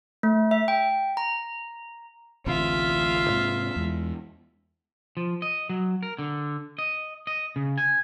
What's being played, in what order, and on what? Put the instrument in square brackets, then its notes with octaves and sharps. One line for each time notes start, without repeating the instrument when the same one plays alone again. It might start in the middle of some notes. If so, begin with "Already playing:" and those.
[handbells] A3
E5
G5
A#5
[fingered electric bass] A1 D2 C3 [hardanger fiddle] F4 E5
[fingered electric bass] G#2 C3
E2 G#3
[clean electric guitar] F3
D#5
F#3
A#4
D3
D#5
D#5
C#3
G#5